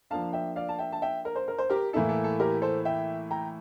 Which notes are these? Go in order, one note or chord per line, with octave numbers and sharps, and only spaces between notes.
F3 A#3 D4 F5 A5
E5 G5
D5 F5
A5
E5 G5
A5
E5 G5
A#4
C5
A#4
C5
G4 A#4
A2 E3 A#3 E4 A4
A4
A4
G4 A#4
A4 C5
E5 G5
G5 A#5